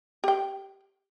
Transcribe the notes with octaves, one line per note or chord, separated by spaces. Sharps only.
G4 G5